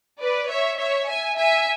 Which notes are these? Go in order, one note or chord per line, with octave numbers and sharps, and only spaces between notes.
B4 D5
C#5 E5
C#5 E5
E5 G#5
E5 G#5